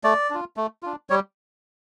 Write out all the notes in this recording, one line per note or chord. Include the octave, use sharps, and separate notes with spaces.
A3 D5
D4 F4
A3
D4 F4
G3 C#5